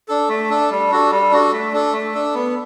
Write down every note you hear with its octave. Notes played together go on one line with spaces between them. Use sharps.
D4 A4
A3
D4 A4
G3
D4 F#4 A4
G3
D4 F#4 A4
A3
D4 A4
A3
D4 A4
B3